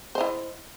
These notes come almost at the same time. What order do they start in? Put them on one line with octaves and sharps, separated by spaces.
C5 D#5 E4